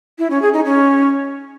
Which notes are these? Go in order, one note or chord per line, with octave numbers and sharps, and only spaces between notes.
E4
C#4
G#4
D#4
C#4